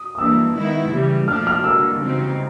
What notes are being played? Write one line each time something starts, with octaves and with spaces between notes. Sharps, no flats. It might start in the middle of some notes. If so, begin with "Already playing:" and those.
Already playing: D#6
D#6
E3 G3 A#3 D4 E6
D#3 G#3 B3 E4
C#3 E3 G3
A#2 F3 A3 D4 F6
F6
D3 G3 A#3 E6
C#3 E3 G3 C4 D#4